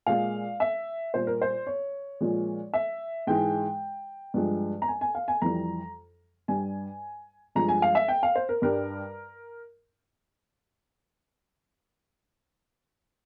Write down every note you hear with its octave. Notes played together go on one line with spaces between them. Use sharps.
A#2 G#3 F5
E5
A#2 G3 C5
A#4
C5
C#5
A#2 F3 G#3
E5
G#2 E3 G#3 G5
G2 F3 G#3
A#5
G#5
G#5
F5
G#5
F2 E3 G3 A#5
G2 G3 G#5
G2 F3 G#3 A#5
G#5
F5
E5
G5
F5
C5
A#4
G2 G3 A#4